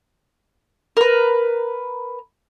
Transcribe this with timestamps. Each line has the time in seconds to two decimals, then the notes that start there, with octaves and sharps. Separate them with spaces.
0.97 A#4 B4